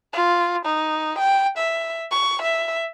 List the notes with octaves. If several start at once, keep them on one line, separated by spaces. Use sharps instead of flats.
F4
D#4
G5
E5
C#6
E5